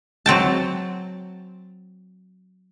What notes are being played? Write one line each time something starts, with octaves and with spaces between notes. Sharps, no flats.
F#3 C4 G5 A5